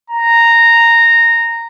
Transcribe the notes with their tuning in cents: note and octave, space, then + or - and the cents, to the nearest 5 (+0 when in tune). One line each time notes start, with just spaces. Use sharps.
A#5 -10